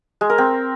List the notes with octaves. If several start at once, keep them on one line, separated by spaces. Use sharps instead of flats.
G#3
A#4
C4